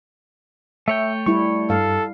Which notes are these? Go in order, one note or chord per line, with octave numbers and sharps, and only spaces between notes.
A3 C#5 E5 G5
G3 E4 C#6
G2 A4 F5